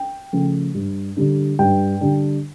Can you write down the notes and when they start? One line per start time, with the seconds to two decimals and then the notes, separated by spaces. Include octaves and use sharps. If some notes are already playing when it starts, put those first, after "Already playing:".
Already playing: G5
0.33 C#3 F3 A3
0.75 G2
1.17 D3 G3 D4
1.59 G2 G5
2.01 D3 G3 D4